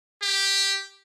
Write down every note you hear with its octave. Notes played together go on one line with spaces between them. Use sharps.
G4